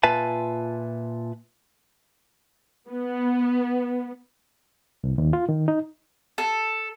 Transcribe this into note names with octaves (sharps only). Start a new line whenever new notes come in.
A#2 F4 B4 E5 G#5 A5
B3
C2
D#2
F4
D#3
D#4
A4